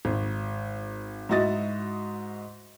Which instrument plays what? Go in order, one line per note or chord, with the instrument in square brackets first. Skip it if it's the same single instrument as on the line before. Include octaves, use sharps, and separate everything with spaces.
[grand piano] G#1
G#2 E4 F#4 D#5 A6